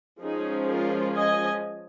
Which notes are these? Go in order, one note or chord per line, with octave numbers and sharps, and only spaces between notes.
F3 G#3 C#4 D#4 G#4
F4 A#4
D#5 G#5